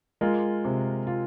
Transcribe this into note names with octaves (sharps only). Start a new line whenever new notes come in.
G#3 F4 A#4
C3
F4